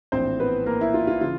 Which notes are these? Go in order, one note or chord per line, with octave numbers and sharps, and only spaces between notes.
A#1 A2 E3 C4 C5
B3 B4
A#3 A#4
E4
F4
F4
C#3 E3 F4